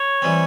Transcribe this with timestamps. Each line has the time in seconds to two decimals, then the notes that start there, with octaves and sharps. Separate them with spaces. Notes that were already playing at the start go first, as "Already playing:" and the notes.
Already playing: C#5
0.22 E3 G3 C4